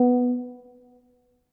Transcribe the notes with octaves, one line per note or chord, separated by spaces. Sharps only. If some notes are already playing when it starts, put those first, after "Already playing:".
Already playing: B3